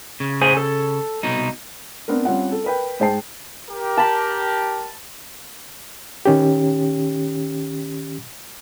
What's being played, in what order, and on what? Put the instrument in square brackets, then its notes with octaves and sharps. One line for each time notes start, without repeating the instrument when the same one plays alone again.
[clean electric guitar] C#3
[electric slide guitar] G#4 C5 G#5
A4
[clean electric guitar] C2 B2 D#4
[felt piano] B3 C4 D4 A#4
G3 C4 C#4 F4 F#5
A4
A#4 B4 G5
G#2 G#4 C5 G5 A5 C7
[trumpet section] G4 A#4
[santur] A5 B5
[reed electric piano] D#3 C#4 G4